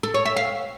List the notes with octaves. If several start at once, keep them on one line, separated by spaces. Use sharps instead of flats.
A4
C#5
E5
F5